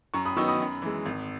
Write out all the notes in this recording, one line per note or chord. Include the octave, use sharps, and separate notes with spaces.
F#2 A#5 C#6
B5 D#6
D#3 F#3 B3 D#4 C#6 E6
B5 D#6
F#2
E3 G#3
G#1